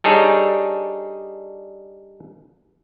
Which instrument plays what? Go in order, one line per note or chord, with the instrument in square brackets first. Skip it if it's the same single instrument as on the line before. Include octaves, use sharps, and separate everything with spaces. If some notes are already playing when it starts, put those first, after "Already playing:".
[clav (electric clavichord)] G3 D4 D#4 G#4 A4 C#5